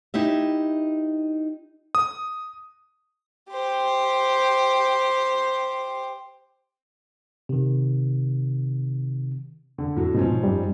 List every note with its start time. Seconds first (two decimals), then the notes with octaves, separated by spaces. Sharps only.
0.14 D#4 E4 G4 E5
1.95 D#6
3.50 G4 C5
7.49 C3 D#3
9.78 D3
9.96 A2 F#3 A3
10.15 G#2 B2 F3 C#4
10.43 F#2 G3